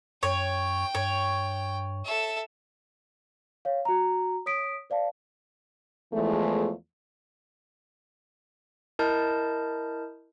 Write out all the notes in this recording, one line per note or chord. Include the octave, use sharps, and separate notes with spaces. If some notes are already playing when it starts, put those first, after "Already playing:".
F#2 C#5 G5
G2 C#5
A4 E5
C#5 F5
F#4 A#5
C#5 D#6 B6 D7
C5 D5 F5 A5
E2 E3 F3 G#3 A3
E4 A#4 D#5 A5 G6